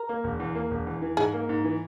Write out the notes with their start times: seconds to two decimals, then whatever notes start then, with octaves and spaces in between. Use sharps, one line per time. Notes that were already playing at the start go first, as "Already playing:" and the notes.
Already playing: A#4
0.09 A#3
0.24 E1
0.40 E2
0.55 A#3
0.71 E1
0.87 E2
1.02 E3
1.17 G#2 G#4
1.33 A#3
1.49 G#2
1.64 E3